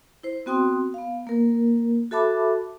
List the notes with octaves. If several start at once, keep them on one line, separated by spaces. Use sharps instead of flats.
E4 C5
B3 C4 F#4 G5 C6 D#6
B3 F5
A#3 A#4
F#4 A4 E5 A5 B5 D6